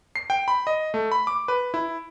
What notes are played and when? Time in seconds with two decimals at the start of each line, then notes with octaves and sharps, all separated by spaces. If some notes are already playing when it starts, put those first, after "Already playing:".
0.16 C7
0.30 G5
0.48 B5
0.67 D#5
0.94 A3
1.12 B5
1.27 D6
1.48 B4
1.74 E4